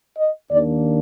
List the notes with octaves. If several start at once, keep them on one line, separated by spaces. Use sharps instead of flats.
D#5
D#2 D#3 A#3 D4 D5